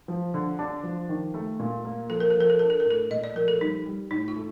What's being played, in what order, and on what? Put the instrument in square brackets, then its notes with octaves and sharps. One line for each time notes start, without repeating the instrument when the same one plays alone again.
[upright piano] F3
D3
D4
F3
D#3
A3
A#2
A#3
[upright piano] F3 [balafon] A4
[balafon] A#4
[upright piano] F3 [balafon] A4
[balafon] A#4
A4
[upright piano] D4 [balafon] A#4
[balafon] A4
A#4
[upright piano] A2
[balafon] A4
[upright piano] A#2 [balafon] D#5
[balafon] D5
[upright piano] F3 [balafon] A#4
[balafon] A4
[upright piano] G3 [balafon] D#4
[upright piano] G3
[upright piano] A2 [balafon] D#4
[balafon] F4
[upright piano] A3